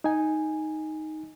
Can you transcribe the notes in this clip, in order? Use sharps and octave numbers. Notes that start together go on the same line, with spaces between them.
D#4 G#5